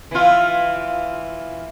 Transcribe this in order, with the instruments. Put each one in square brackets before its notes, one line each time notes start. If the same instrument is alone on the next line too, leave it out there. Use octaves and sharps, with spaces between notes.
[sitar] E3 F4